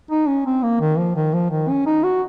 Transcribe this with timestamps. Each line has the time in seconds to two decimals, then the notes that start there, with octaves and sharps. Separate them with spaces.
0.11 D#4
0.28 C#4
0.46 C4
0.63 A#3
0.80 D#3
0.98 F3
1.16 D#3
1.34 F3
1.51 D#3
1.69 C#4
1.87 D#4
2.04 F#4